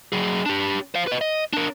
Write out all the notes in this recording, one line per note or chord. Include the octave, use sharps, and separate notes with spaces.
F#3 G#4
D4 G4
C5 F5
B4 D#5
D#5
D4 A#4